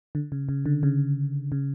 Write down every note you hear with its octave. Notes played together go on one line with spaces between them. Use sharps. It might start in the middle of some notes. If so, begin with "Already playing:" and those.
D3
C#3
C#3
D3
C#3
C#3